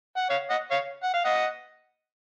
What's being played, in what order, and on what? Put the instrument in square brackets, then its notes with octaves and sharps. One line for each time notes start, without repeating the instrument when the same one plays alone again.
[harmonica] F#5
C#5 F5
D#5 F#5
C#5 F5
F#5
F5
D#5 F#5